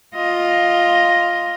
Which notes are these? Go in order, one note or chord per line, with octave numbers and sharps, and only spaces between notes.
F4 D#5